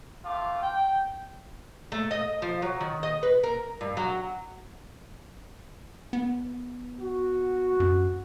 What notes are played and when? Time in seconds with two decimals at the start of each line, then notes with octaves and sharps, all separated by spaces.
0.25 A3 C4 F4 F5 D6
0.63 G5
1.92 A3
2.11 D#5
2.42 F3
2.62 F#3
2.81 D#3
3.03 D#5
3.23 B4
3.44 A#4
3.81 G2
3.97 F#3
6.13 B3
7.00 F#4
7.80 F#2